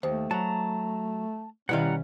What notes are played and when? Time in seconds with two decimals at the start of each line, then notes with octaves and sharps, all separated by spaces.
0.03 D#2 A3 C5
0.31 F#3 A5 A#5
1.69 B2 D#3 G3 C#4 E4 F5 F#5 A#5